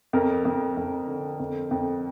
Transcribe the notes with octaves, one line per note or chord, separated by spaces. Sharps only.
F2 A#4
F2
F2
D3
F2
F2